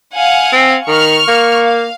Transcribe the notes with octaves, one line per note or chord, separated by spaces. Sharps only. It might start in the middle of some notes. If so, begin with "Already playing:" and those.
F5 F#5 G#5
C4
D#3 C#6 F6
A#3
F5